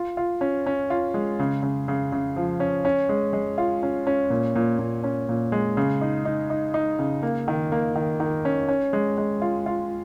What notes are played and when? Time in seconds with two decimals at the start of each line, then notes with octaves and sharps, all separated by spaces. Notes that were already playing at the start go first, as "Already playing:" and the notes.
Already playing: F4
0.17 F4
0.41 C#4
0.66 C#4
0.90 F4
1.14 G#3
1.39 C#3
1.63 C#3
1.88 C#3
2.12 C#3
2.36 F3
2.60 C#4
2.85 C#4
3.09 G#3
3.33 G#3
3.58 F4
3.83 C#4
4.07 C#4
4.30 A#2
4.56 A#2
4.79 A#2
5.04 C#4
5.29 A#2
5.52 G#3
5.77 C#3
6.01 D#4
6.25 D#4
6.50 D#4
6.74 D#4
6.99 C#3
7.23 A#3
7.48 D#3
7.72 A#3
7.96 D#3
8.20 D#3
8.45 C#4
8.69 C#4
8.93 G#3
9.18 G#3
9.42 F4
9.66 F4